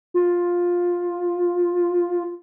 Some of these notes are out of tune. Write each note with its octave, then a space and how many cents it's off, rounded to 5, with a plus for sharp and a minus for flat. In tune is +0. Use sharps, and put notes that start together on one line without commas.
F4 +10